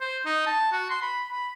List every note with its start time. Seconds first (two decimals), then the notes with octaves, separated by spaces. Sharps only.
0.01 C5
0.26 D#4
0.46 A5
0.72 F#4
0.90 C6
1.02 B5
1.31 B5